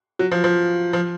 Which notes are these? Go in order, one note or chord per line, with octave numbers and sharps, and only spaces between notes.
F#3
F3
F3
F3